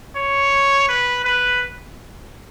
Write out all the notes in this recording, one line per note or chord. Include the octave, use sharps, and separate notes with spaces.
C#5
B4
B4